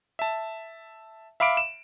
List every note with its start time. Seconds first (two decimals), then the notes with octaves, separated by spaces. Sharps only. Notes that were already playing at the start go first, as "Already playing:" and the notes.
0.19 E5 A5
1.40 E5 F5 B5 D6 D7
1.57 E7